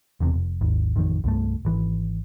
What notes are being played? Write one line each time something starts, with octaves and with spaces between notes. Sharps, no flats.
E1 E2 C3
F1
G#1 D#2
A1 F2 D#3
C2 G2 A3
G#1 E3